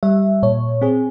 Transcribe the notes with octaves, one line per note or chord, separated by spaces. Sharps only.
G3 E5
A#2 C#5
C4 G#4